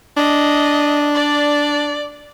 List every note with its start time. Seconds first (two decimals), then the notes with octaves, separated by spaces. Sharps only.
0.17 D4 D#5
1.15 D5